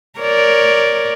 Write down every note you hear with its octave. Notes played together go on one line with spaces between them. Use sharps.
A#4 C#5 D5